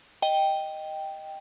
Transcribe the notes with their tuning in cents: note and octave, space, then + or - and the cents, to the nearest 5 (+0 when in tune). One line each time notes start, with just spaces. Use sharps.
D#5 +0 G5 +0